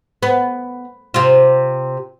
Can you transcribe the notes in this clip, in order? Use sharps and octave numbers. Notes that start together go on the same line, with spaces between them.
B3
C3 F4